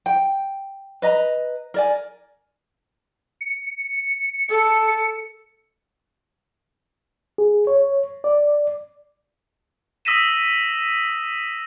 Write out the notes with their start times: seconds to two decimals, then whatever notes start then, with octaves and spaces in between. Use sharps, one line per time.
0.06 G5
1.02 B4 D#5 A#5
1.74 A#4 D5 G#5
3.41 C#7
4.50 A4
7.38 G#4
7.67 C#5
8.24 D5
10.05 D#6 E6 A#6 B6 D#7 E7